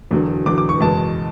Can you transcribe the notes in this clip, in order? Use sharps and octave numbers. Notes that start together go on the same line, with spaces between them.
E1 E2 D3 F#3
E1 E2 D3 F#3 D6
D6
C#6
F#1 E2 B2 G#3 A5